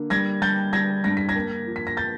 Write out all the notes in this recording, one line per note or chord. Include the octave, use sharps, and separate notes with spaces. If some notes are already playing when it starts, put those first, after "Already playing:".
Already playing: D3 A#3
G3 G#6 A#6
G3 G6 A6
G3 G#6 A#6
G2 A#6
B6
G#6 A#6
A#3
F3
B6
A#6
G6 A6